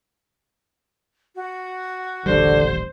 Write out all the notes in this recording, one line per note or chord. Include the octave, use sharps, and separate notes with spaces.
F#4
D#1 A1 D3 G3 C5